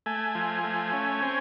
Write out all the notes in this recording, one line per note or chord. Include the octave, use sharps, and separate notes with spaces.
A3 G#5
F3
A3
C#4
C4